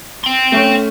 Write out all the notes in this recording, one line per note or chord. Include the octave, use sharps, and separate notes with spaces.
G5 C6
A3 C#4